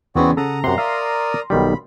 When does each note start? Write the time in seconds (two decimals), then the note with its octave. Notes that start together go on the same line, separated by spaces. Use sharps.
0.16 E2 C#3 B3 C4 F#4 D5 G#5
0.37 C#3 A4 F#5 A#5 D#6
0.64 F#2 C3 F#5 C6
0.78 A#4 D5 E5 F5 D#6
1.50 B1 D#3 G3 B5